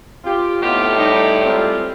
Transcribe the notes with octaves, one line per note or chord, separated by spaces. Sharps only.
C4 F4 G4
A2 B3 D#4 F4 G4
G3 D#4
G#3 C4 F4